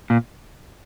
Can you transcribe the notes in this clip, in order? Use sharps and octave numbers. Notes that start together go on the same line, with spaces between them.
A#2